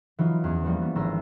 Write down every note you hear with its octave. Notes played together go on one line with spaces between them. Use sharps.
E3 F#3 D#4 F4
E2 C#4
E3 F3 G3 A#3
B3
G#1 A#5 C6 E6 A#6